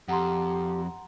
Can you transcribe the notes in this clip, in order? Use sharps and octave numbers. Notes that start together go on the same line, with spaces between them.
F2 G4 F#5 A#5 C6